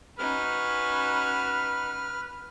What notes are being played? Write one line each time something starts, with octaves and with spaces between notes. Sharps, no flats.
C#4 D#4 F#4 B4 F6